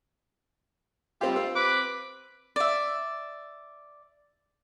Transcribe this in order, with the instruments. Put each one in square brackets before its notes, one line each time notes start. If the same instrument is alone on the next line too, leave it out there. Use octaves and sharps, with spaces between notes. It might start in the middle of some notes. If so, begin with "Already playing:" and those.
[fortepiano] G3 C4 G4 [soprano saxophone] F4
[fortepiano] C4 E6
[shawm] B4 [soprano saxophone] D6
[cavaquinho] D5 E5